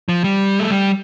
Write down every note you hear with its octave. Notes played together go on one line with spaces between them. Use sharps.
F3
G3
A3
G3